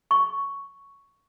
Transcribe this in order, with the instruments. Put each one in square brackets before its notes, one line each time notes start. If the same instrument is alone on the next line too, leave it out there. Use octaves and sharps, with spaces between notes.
[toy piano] C#6